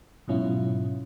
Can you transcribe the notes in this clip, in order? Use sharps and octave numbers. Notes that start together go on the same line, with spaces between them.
G#2 B2 F#3 C#4 E4 F4